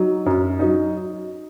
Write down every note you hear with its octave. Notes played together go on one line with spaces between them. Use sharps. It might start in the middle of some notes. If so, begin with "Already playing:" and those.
Already playing: F#3 D#4
F#2
F#3 D#4